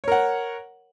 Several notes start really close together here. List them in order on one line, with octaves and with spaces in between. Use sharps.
C#5 A#4 F#5